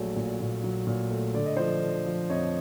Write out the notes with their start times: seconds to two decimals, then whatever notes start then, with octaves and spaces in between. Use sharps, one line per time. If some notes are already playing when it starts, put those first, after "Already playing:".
Already playing: A#1 F#3 A3 C#5
0.16 A#2
0.40 A#2
0.64 F#3
0.87 A#2
1.11 A3
1.34 D3 D5
1.46 D#5
1.56 F3 C5 D5
1.82 D3
2.06 F3
2.30 F2 C#5 D#5